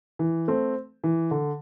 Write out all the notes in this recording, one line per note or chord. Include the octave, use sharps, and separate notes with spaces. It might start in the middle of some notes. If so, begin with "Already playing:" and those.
E3
A3 C4
E3
D3